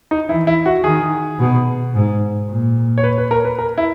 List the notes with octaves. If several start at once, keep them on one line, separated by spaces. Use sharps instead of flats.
D#4
E3 E4
E4
F#4
D#3 G#4
B2
G#2
A#2
C#5
B4
B4
A#4
B4
A#4
E4